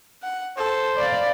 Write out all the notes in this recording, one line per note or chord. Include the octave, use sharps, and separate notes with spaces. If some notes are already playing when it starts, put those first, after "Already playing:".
F#5
A4 C5
D5 F5 B5